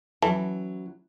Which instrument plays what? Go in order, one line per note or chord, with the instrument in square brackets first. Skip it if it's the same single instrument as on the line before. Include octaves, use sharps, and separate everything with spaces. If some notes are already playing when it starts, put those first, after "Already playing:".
[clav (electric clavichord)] E3 [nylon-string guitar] F#3 C#4 E4 [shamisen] A5